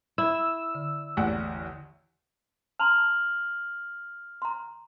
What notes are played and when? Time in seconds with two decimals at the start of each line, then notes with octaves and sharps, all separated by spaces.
0.18 E4 E6
0.75 D3
1.17 A1 E2 D5 F#5
2.79 A5 A#5 C6 F6 F7 F#7
4.42 A#5 C6